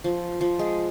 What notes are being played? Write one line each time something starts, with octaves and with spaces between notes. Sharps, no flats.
F3
F3
G#3